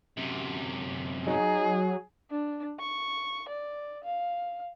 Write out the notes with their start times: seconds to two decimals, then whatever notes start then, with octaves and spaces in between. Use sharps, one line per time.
0.17 F#2 C3
1.27 F#3 D#4 G#4
2.31 D4
2.79 C#6
3.49 D5
4.04 F5